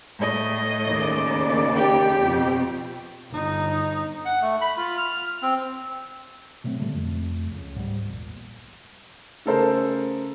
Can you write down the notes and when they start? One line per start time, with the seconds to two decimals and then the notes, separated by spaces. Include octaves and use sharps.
0.17 A2 D#5
0.87 D#2 C#3 D5
1.76 G4
2.22 F2 B2
3.30 G1 D#4
4.25 F#5
4.42 A3
4.61 B5
4.77 F4
4.98 F6
5.42 C4
6.64 B2 F#3 A3 C4
6.79 A#2 D3 G3 A3
6.94 F2 A3
7.51 C#2
7.76 G#2 G3
8.08 E1 A#1
9.46 C#3 A3 A4 A#4 C5